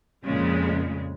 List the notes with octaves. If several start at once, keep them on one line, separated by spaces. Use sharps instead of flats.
F2 A#2 C#3 G#3